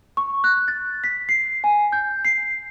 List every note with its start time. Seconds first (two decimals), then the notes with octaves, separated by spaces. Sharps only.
0.17 C#6
0.44 F#6
0.68 A6
1.04 B6
1.29 C7
1.64 G#5
1.92 G6
2.25 C7